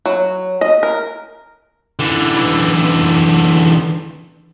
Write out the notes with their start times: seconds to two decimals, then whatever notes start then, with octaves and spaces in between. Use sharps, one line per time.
0.06 F#3
0.61 D#5
0.83 A#4
1.99 D3 E3